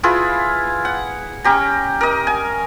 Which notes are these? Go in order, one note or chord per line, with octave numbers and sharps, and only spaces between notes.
E4 F4 G#4 B4
F#5
C#4 G4 A#5
A#4 D#5
G#5